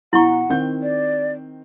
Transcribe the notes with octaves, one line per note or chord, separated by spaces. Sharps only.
B2 E4 F#5 A#5 C#6
D#3 C4 G6
D5